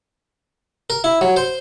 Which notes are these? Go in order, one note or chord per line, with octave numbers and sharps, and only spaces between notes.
A#4
E4
F#3
C5